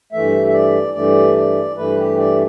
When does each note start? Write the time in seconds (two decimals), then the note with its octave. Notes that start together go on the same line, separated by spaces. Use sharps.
0.12 G2 E3 A3 E5
0.47 E5
0.53 D5
0.94 G2 E3 A3 D5
1.35 D5
1.77 G2 E3 A3 B4
1.97 G4
2.18 D5